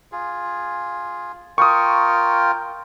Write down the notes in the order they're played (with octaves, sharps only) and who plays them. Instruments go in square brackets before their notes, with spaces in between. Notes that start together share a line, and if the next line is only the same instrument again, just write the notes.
[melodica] F4 G#4
[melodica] F4 A#4 G5 [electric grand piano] C#6 D#6